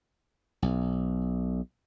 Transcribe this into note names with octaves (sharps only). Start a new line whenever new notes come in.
B1